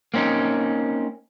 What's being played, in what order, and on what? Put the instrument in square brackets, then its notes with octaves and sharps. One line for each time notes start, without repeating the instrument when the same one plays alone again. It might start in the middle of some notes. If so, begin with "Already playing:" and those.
[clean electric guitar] A#3 C4 C#4 D#4